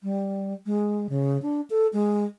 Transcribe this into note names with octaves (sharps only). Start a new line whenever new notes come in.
G3
G#3
C#3
D4
A4
G#3